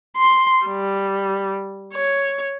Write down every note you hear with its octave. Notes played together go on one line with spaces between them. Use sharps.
C6
G3
C#5